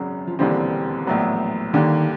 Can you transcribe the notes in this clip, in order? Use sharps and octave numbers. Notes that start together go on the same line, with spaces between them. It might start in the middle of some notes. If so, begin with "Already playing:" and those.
Already playing: G#1 F#2 C#3 F#3
F3
E1 D#2 D3 E3 G3 C4
A#1 A2 F#3 B3
D#2 D3 D#3 G3 A#3